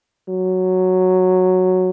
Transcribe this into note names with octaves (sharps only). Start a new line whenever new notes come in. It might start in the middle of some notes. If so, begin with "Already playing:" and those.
F#3